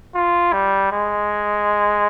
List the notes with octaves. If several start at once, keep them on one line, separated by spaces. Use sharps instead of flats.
F4
G3
G#3